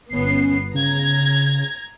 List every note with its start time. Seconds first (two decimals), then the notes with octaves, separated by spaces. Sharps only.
0.13 G1 B3 C#4 C7
0.75 C#3 A#5 G#6